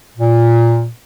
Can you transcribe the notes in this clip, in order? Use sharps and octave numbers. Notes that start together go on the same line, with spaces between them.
A#2